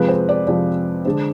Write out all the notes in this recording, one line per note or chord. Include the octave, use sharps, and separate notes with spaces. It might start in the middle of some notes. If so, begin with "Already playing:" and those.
Already playing: F2 C3 F3 G#3 B4
C5
D5
F2 C3 F3 G#3 D5
D3 G#3 D4 C5